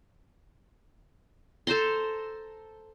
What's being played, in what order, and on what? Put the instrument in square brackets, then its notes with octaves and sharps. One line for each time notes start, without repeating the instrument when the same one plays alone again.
[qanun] A4 C5 A#5 C6